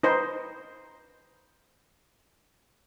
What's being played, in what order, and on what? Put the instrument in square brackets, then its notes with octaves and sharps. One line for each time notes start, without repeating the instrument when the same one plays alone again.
[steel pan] D#4 B4 C5